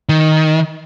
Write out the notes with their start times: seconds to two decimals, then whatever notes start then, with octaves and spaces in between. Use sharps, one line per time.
0.09 D#3